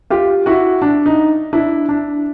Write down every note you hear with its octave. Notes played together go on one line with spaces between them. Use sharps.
F4 G4
E4 F#4
D4
D#4
D4 E4
D4